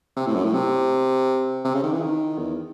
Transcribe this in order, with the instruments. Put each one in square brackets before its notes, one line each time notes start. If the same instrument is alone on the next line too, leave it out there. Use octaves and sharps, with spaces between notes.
[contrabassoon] C3
A2
F#2
A2
C3
C3
C#3
D#3
E3
D#3
E2